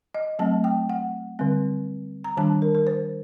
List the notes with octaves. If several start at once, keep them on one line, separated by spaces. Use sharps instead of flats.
D#5
F#3 A3 C4 A5
G5
F#5
D3 G3 C4
A#5
D#3 G3 D4 A5
A#4
A#4
C5